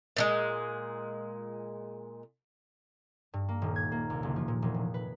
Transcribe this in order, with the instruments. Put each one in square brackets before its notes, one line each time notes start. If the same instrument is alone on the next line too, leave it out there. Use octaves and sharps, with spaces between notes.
[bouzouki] A#2 D#3 G#3
[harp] G2
A#3
D#1
G#6
A#3
C2
F#1
F3
A#2
E1
F1
B4